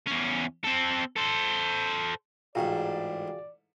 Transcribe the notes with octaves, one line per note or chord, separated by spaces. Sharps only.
E2 C#4
C4 A4
A4 C5
A1 G#2 F4 F#4 G#4 D5 F5 G5